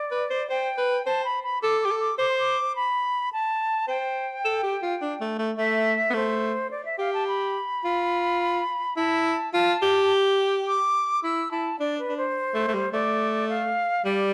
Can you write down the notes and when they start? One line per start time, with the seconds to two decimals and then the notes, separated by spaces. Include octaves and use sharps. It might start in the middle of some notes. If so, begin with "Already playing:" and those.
Already playing: D5
0.11 B4
0.30 C5
0.50 C5 G5
0.78 B4
1.06 C5 A5
1.25 B5
1.44 B5
1.62 A4 D6
1.81 G4 D6
1.91 A4
2.00 D6
2.19 C5 D6
2.29 C6
2.39 D6
2.76 B5
3.33 A5
3.88 C5 G5
4.45 A4
4.63 G4
4.82 F4
5.02 D4
5.21 A3
5.39 A3
5.58 A3 E5
6.10 B3
6.14 A3 C5
6.71 D5
6.85 E5
6.99 G4 F5
7.13 A5
7.28 B5
7.85 F4
8.97 E4 A5
9.54 F4 A5
9.82 G4
10.67 D6
11.23 E4 E6
11.51 E4 A5
11.80 D4 D5
11.99 B4
12.08 D4
12.17 C5
12.55 A3
12.68 A3
12.74 G3
12.93 A3 D5
13.49 F5
14.05 G3 D5